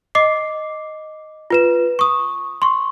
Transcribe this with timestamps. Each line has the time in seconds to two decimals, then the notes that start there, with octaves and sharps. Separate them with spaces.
0.15 D#5 D6 C7
1.50 F4 B4 E7
1.99 C#6 D#6
2.62 C6 C#6